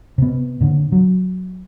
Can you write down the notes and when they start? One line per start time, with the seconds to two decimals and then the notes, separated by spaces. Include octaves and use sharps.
0.18 C3 B3
0.61 A#2 D3
0.92 F#3